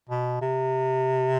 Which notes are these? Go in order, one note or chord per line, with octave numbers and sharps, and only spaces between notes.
B2
C3